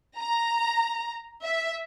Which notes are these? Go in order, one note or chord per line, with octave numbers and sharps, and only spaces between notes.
A#5
E5